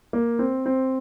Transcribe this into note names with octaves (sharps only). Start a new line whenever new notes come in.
A#3
C4
C4